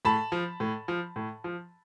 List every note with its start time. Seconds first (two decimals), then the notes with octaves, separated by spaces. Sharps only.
0.05 A2 A5 B5
0.32 F3
0.60 A2
0.88 F3
1.16 A2
1.44 F3